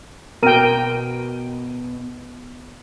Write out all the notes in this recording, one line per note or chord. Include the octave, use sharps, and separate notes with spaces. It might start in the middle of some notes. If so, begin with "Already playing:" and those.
B2 A#4 G5 D7 D#7